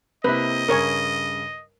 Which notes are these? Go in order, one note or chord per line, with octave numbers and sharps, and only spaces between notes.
C3 A#3 E4 B4 D#5
G2 C#3 A#4 C#5 G#5